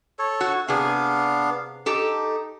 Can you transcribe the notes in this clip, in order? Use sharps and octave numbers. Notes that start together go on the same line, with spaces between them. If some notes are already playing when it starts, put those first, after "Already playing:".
A4 C#5
F#4
C3 B3 D4 G#4 F5
D#4 G4 A4